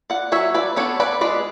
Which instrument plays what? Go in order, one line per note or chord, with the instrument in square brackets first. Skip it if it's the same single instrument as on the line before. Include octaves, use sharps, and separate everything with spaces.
[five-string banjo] D5 F#5
F#3 C#5 E5
B4 D5
B3 D4 A4 C#5
B4 D5
G#3 B4 D5